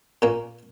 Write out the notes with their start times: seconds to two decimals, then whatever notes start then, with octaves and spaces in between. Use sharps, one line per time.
0.22 A#2 A#3 C#4